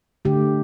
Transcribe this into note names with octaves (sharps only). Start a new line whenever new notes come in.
D3 A3 G4